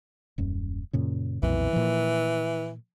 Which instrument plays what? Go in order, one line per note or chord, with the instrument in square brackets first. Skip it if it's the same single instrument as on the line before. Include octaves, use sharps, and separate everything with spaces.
[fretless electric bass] D#1 F#2
F#2 A#2 C#3
[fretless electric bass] B1 F2 A#2 [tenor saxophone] E3
[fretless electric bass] A#2 F3